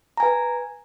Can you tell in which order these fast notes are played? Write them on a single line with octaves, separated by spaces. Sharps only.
A#5 G#5 B4